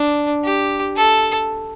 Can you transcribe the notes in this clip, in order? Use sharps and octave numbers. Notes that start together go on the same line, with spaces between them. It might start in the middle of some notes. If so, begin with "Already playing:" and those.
Already playing: D4
G4
A4